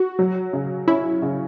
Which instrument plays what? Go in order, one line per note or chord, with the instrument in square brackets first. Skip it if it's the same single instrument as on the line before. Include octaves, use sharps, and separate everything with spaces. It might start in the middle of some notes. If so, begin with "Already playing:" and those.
Already playing: [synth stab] F#4
[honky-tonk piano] F#3
C#3
[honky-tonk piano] C#4 [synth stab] E4
[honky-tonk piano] C#3